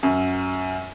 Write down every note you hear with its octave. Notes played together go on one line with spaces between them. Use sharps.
F#2